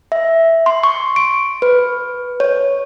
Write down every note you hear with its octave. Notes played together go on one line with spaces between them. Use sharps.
E5
C6
C#6
D7
B4
C#5